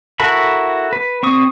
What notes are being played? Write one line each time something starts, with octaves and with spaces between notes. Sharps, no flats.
E4 F#4 A4 A#4 B5
B4
C4 C#6 D#6